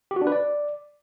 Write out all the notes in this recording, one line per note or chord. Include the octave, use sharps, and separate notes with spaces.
G4
F#4
D4
B4
D5